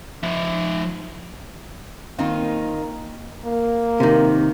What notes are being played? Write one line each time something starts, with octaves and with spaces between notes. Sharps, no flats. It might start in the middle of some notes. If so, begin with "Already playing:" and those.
F3 E5
D#3 A#3 C4 D#4 F4
A#3
C3 D#3